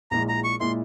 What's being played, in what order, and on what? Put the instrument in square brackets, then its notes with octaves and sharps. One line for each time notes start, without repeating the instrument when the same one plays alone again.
[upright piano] A#1 A#2 G#3 E4 [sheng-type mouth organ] A#5
[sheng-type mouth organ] A#5
C#6
[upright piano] A#2 G#3 E4 [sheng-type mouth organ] C6